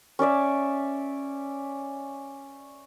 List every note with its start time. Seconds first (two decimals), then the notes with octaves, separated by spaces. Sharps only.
0.19 C#4 C#5 D5 E5